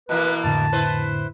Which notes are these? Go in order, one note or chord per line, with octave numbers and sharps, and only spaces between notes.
B2 E3 A#3 B4
F2 A2 D3 A5
E4 B4 C5